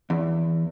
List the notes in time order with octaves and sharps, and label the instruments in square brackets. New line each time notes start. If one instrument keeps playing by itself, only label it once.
[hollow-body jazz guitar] E2